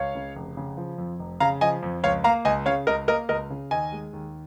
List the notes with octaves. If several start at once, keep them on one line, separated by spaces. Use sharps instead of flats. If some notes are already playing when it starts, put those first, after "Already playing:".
Already playing: C#2 C#5 F5
C#3
F1
C#3
F3
F2
F1
C#3 F5 A#5
F3 D#5 G#5
F2
C#2 C#5 F5
A#3 F5 A#5
C#2 D#5 G#5
C#3 C#5 F5
C#2 A#4 D#5
A#3 A#4 D#5
C#2 A#4 D#5
C#3
D#2 D#5 G#5
G#3
D#2